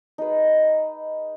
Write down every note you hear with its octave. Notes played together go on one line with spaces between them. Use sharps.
D#4 G#4 B4